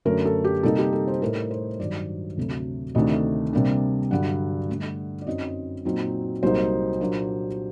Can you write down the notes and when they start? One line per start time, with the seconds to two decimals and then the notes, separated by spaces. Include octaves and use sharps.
0.05 F#2 D3 A3 A#4
0.25 A4
0.44 G4
0.63 C3 G3 A#3 D#4 A4
0.78 G4
0.93 A4
1.08 C5
1.22 A2 A3 D#4 A#4
1.51 C5
1.79 G2 D#3 F#3 D5
2.37 D2 C3 F#3 A3
2.95 D2 C3 D#3 A3 D4 D#5
3.53 C3 G3 A#3 D4
4.11 G2 D3 F#3 F#5
4.69 G2 D3 A3
5.22 D5
5.27 F#2 F#3 C4 D#4 D#5
5.85 A#2 F#3 C4 D#4
6.43 C2 C3 F#3 A#3 D#4 C5
7.00 A#2 F#3 A#3 D4